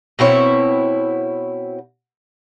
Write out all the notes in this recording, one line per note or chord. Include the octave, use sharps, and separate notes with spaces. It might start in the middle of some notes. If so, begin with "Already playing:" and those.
B2 C4 E4 C#5